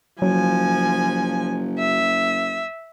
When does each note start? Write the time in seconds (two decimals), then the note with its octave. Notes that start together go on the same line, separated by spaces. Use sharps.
0.22 F#1 F3 F#3 G#5
1.79 E5